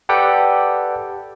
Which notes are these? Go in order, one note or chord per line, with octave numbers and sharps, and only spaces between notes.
G4 A4 B4 D5 F#5 G5